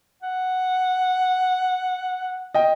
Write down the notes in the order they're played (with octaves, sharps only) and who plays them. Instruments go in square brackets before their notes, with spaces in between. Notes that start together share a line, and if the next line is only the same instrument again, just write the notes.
[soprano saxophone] F#5
[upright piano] D#5 G5